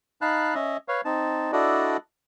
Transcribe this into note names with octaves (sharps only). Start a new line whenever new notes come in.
D#4 F5 A5 B5 F#6
C#4 D#5 E5
B4 C#5 F5
C4 D#4 A5
D4 E4 F#4 A4 D5 D#5